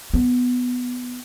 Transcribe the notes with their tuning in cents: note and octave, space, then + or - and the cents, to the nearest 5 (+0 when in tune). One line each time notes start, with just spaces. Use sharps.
B3 +5